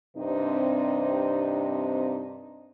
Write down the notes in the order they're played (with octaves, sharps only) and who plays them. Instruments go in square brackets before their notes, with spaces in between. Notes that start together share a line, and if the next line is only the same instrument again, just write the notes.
[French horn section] G2 C3 C4 D4 D#4